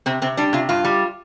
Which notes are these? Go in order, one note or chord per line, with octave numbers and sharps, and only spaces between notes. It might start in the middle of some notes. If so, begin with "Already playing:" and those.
C3 C4
C3 C4
G3 D4
C3 F4
G2 F4
G3